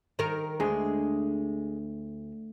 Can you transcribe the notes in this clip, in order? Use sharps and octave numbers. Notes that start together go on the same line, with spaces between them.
D#3 A#4
D2 G#3 G#4